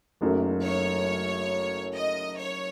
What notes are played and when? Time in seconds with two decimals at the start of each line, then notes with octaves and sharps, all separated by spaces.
0.21 F#1 F#2 D#3 F#3 A3
0.64 C#5
1.95 D#5
2.38 C#5